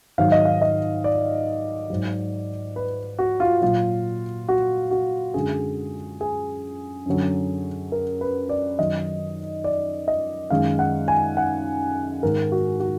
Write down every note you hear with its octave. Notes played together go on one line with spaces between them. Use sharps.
G#2 D#3 F#3 F5
D#5
F5
D#5
D5
G#2 F#3
B4
F#4
F4
A#2 F#3 F4
F#4
F#4
F#2 D3 G#3 G#4
G#4
F#2 D3 F#3
A#4
B4
D5
F#2 D#3 F#3 D#5
D5
D#5
F#2 D#3 G#3 F5
F#5
G#5
F#5
G#2 D#3 G#3 A#4
F#4
F#4